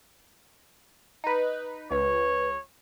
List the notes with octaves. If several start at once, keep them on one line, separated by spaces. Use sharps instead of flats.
D#4 B4
C#2 B4 C#5